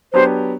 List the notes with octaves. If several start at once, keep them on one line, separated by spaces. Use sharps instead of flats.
F#3 B3 D4 G4 C5